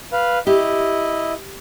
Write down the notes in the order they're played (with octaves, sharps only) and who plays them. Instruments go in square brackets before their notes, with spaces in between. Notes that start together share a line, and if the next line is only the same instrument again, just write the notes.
[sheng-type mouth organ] B4 F5
[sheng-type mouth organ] E4 D#5 [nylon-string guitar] G4